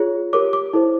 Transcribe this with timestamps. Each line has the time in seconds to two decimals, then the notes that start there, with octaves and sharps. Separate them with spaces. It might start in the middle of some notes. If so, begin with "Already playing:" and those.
Already playing: F4 G#4 C#5
0.33 G4 A#4 C#5 D6
0.53 D6
0.73 E4 A4 C5